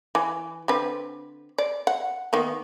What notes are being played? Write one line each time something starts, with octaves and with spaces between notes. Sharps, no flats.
E3
D3 C4 B4
D5
F#5
D#3 A#3 B3